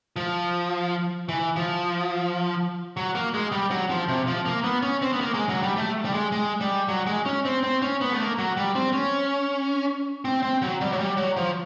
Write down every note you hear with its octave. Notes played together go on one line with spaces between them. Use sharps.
F3
E3
F3
F#3
A#3
G#3
G3
F#3
F3
C3
F3
A#3
B3
C#4
C4
B3
A#3
G#3
F#3
G3
A3
G3
G#3
G#3
G3
F#3
G#3
C#4
C4
C4
C#4
B3
A3
A#3
F#3
G3
C4
C#4
C4
C4
F#3
G3
F#3
G3
F#3
F3